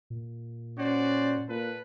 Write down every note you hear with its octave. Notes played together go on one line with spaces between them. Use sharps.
A#2
C#4 F#4 C5 D5
A#2 A4 B4